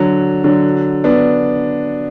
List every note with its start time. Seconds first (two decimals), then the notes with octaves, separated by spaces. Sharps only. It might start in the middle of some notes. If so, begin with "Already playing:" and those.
Already playing: D3 F#3
0.44 D3 F#3
1.04 B3 D4